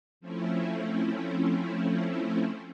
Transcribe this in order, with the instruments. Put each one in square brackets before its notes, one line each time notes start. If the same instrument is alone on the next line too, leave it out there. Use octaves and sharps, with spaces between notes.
[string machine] F3 A3 C4 C#4 E4